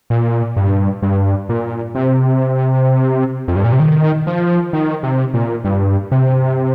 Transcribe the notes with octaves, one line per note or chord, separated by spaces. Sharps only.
A#2
G2
G2
A#2
C3
F2
G2
A#2
C3
D#3
F3
D#3
C3
A#2
G2
C3